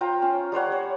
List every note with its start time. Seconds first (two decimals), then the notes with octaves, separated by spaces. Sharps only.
0.01 F4 C5 G5 A#5
0.22 C#4
0.52 G3 C5 C#5 F#5
0.72 C#5